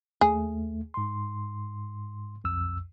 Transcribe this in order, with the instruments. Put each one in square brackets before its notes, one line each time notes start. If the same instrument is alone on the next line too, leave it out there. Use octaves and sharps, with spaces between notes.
[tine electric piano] D#2 A3 [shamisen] G#4
[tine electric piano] G#2 C6
B1 F2 E6